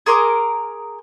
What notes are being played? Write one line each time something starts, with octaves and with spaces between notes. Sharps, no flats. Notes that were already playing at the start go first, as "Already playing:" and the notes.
G#4 A#4 C6 D6